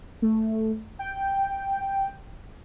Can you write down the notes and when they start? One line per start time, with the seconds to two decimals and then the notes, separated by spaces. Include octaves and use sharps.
0.22 A3
0.99 G5